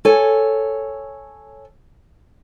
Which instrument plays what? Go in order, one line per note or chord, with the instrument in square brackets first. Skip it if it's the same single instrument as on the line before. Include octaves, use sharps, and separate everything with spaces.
[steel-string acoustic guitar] A4 C#5 G#5